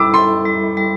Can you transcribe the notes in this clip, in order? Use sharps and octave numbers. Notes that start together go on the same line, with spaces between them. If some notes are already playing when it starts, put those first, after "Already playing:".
Already playing: G3 E4 A4 D6 E6
A4 C6
G3
G3